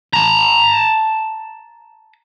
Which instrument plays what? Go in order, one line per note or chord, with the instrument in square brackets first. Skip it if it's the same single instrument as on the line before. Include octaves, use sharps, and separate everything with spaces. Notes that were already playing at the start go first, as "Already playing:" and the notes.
[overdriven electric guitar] A5 A#5